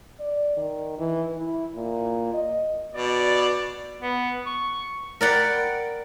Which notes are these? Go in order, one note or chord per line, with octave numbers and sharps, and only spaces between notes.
D5
D#3
E3
E4
A#2
D#5
B2 D5
B3
C#6
A#4 D5 F#5 G5 B5